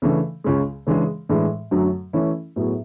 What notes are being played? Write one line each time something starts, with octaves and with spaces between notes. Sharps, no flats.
C#3 E3 A3 D4
C#2 C#3 G#3
C#3 E3 G#3 D4 G#4
A2 E3 G#3 D4
F#2 D3 F#3 A3
E3 A3 C#4 E4
A2 F#3 B3 E4 G#4